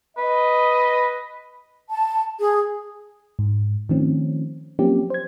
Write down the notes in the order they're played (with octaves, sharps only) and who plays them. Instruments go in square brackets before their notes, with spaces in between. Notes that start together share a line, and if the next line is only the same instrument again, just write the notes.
[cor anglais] B4 [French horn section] D#5
[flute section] A5
G#4
[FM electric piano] G#2
D#3 F3 A3 C4 C#4
F3 F#3 A#3 C4 C#4 G4
C5 G#6